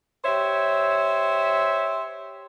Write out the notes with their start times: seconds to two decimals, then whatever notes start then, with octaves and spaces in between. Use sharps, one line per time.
0.25 G4 C5 C#5 E5